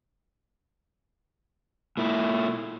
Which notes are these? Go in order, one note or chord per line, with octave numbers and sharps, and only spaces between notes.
A#2 E4